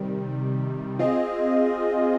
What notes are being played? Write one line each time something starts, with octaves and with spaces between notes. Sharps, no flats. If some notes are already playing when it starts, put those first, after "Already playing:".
Already playing: C3 D#3 G3
C4 F4 G#4 D#5